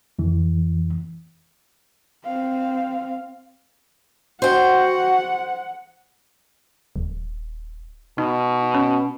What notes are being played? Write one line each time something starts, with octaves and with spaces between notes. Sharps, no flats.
F2 E3
C4 F5
F#4 C5 F#5 G5
D#1
B2 D#4
C#4